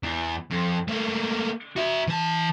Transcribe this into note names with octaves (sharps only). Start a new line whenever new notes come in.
E2
F2
A3 A#3
F#4 E5
E3 A5